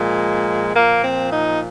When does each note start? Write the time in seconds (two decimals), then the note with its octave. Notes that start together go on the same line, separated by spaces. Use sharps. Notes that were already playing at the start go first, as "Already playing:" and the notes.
Already playing: A#2 F3 G#3
0.75 A#2 F3 A#3
1.02 C4
1.31 D#4